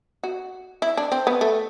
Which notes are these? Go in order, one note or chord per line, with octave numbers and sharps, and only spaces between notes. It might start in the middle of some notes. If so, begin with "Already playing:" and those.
F#4
E4
D4
C4
B3
A3